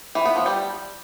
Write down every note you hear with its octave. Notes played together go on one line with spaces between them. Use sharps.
E3
B3
F3
G3